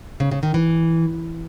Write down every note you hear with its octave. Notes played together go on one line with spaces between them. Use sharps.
C#3
C#3
D#3
E3